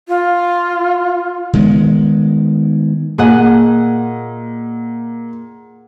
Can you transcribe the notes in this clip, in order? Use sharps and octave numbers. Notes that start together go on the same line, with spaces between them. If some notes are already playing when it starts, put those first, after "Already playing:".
F4
D#3 G#3 B3
A#2 G#4 D#5 F#5